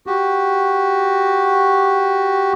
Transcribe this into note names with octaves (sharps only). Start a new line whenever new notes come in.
F#4 G4